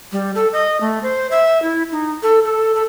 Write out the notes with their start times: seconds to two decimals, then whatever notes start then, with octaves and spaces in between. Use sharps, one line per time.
0.12 G3
0.35 A4
0.53 D#5
0.81 A3
1.03 C5
1.31 E5
1.62 E4
1.92 D#4
2.23 A4
2.44 A4
2.75 A4